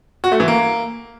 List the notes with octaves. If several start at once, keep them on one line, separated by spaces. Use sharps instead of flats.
F#4
A3
E3
A#3